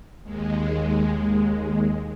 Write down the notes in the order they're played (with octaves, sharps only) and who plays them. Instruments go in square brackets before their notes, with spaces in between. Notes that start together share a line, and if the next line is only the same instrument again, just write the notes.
[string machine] D#2 G#3